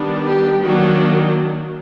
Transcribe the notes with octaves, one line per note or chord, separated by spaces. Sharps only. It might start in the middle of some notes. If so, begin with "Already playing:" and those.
Already playing: D#3 G3 B3 D4
G4
D#3 F#3 A#3 D4 F#4